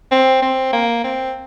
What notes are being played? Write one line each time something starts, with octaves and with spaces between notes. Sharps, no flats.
C4
C4
A#3
C4